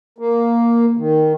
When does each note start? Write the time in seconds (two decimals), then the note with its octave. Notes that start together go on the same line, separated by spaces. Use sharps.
0.18 A#3
0.97 D#3